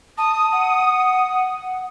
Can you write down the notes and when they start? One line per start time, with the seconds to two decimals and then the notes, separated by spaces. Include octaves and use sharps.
0.18 A5 D#6
0.52 F#5